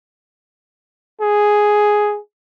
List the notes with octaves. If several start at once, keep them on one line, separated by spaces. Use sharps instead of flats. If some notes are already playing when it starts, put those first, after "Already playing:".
G#4